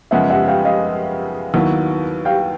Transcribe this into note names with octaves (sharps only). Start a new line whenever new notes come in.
F#2 C#3 F3 G#3 B3 E5 F#5
E5 F#5
F5 G5
D#5 F5
D#2 D#3 F#3 B3 E4
F5 G5